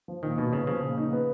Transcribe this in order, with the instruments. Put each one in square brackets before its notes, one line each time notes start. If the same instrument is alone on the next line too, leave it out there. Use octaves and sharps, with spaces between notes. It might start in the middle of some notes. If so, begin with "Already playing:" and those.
[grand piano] F3
[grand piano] A#2 [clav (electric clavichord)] D#3
[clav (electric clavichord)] B2 [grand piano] D#4
[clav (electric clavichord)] C#3 [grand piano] B3
[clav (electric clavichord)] C#3 [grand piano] F3
[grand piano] A#2
D#4
B3